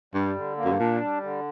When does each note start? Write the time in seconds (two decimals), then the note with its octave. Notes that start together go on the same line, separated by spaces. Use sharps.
0.14 G2 G3
0.36 D3
0.57 A#3
0.64 F#2
0.72 G2
0.79 A#2 D4
1.01 G3
1.23 D3